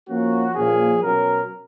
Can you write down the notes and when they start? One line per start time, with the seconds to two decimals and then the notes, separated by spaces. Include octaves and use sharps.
0.08 F3 A#3 C#4 F#4
0.55 A#2 F3 A#3 C#4 G#4
1.02 B2 F#3 C#4 A#4